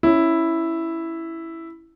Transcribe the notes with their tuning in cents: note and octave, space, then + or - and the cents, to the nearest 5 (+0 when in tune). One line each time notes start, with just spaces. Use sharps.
C#4 +0 E4 +0